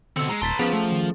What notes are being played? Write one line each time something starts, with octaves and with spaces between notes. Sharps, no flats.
B2 D3 C4 E6 C#7
G#3 A#5
D#1 B4 A5 C6 A6 B6
F3 B3 C#4 G#4
A3
D#3